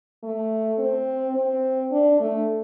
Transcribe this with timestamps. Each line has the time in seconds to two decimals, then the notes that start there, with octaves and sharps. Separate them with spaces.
0.23 A3
0.79 C4
1.36 C4
1.92 D4
2.20 A3